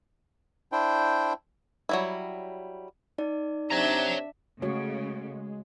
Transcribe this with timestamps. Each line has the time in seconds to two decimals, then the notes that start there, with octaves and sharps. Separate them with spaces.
0.72 D4 E4 C5 G5
1.89 F#3 G3 E4
3.18 D#4 D5
3.71 C3 D4 C#5 E5 A#5
4.62 C#3 G#3 A3 F#4 A4 C#5